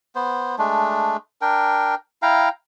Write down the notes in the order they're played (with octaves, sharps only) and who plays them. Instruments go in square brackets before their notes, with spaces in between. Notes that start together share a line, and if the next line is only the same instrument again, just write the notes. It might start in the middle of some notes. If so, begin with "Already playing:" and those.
[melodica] B3 C5
G#3 A3 D4
D4 A#4 G5
E4 F5 G5 A#5